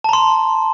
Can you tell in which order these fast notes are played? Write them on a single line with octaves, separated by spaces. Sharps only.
A5 A#5 C6